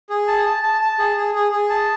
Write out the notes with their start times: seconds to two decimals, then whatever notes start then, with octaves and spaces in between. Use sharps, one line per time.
0.10 G#4
0.28 A5
0.45 A5
0.63 A5
0.81 A5
0.99 G#4
1.17 G#4
1.34 G#4
1.52 G#4
1.70 A5